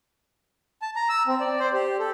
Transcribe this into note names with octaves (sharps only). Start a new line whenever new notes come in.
A5
A#5
E6
C4
D5
C5
G4
A4